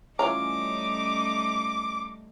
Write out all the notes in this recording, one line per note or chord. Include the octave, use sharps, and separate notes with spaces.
E3 G3 A3 C#4 D#4 F4 A#5 D6